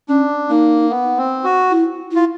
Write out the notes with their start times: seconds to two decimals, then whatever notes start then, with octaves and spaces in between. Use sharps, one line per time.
0.09 C#4 D4
0.49 A#3 D#4
0.90 B3
1.17 C4
1.44 F#4
1.71 E4
2.11 E4 F4